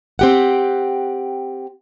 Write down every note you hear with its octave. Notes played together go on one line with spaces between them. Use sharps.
C4 G4 F#5